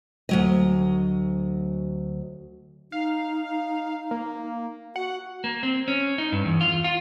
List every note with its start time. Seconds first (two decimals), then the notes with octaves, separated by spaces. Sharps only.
0.29 D2 F#3 D#5
2.92 D#4 F5
4.11 A#3
4.96 F#4 F#5
5.44 A#3
5.63 C4
5.88 C#4
6.18 D#4
6.32 G2
6.45 E2
6.61 F4
6.84 F4